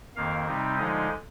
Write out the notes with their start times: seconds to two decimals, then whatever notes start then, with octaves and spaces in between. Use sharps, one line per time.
0.16 F2 D#3 A#3 F5
0.47 C3 G3 C4 D#4
0.78 D3 F3 G#3 D#4 D#5